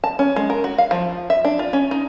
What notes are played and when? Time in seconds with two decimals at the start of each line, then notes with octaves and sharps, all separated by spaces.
0.04 A5
0.19 C#4
0.36 G#3
0.50 A#4
0.64 F#4
0.78 F5
0.91 F3
1.30 E5
1.45 D4
1.59 F4
1.73 C#4
1.91 D#4